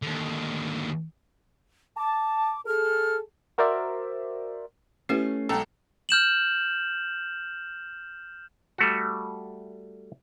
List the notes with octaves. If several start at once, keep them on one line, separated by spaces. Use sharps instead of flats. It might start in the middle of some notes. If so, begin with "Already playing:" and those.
D#2 D3
A5 D6
G#4 A4 F6
F#4 A#4 C5 D5 E5
A3 C#4 E4 G4 B4 C7
B1 G#3 A4 G5 A#5
F6 G6 E7 F#7
G3 A3 F#4